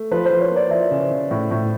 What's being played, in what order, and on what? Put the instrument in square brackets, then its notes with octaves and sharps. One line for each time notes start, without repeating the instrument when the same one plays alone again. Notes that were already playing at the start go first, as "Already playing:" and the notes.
Already playing: [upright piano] A3
[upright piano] F3 [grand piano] B4
[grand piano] C5
[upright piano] F3
[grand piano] C#5
[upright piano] A#3 [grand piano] D5
[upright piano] F3 [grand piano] E5
[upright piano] C#3
C#3
A2
A2